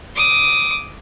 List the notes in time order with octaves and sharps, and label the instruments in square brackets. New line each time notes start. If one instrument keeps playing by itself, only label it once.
[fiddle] D6 D#6